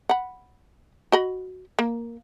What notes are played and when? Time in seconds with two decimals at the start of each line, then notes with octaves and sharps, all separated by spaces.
0.09 F#5 B5
1.12 F#4 D#5 B5
1.79 A#3